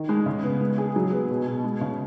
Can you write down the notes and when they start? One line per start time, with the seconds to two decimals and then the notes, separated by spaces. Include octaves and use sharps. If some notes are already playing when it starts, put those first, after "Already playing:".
Already playing: D#3
0.09 G#3
0.26 C#3
0.44 B3
0.61 G#3
0.78 G#4
0.96 F#3
1.13 B3
1.30 B2
1.47 B2
1.64 G#3
1.81 C#3